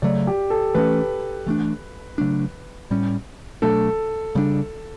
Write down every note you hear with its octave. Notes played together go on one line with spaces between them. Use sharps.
C#3 F#3 A3 D5
G4
A4
E3 A3 C#4 B4
E3 A3 D4
C#3 F#3 A3 D4
A2 G3 C#4
B2 F#3 A3 D4 A4
C#3 G3 B3 D4